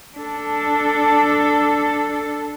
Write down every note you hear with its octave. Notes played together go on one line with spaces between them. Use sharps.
D4 A4